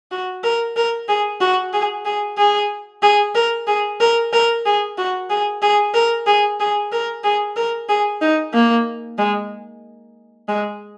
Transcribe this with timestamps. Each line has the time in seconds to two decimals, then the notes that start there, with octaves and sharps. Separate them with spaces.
0.12 F#4
0.44 A#4
0.77 A#4
1.09 G#4
1.41 F#4
1.74 G#4
2.05 G#4
2.38 G#4
3.02 G#4
3.35 A#4
3.68 G#4
4.00 A#4
4.33 A#4
4.66 G#4
4.98 F#4
5.30 G#4
5.62 G#4
5.94 A#4
6.27 G#4
6.60 G#4
6.92 A#4
7.24 G#4
7.56 A#4
7.89 G#4
8.22 D#4
8.54 A#3
9.18 G#3
10.48 G#3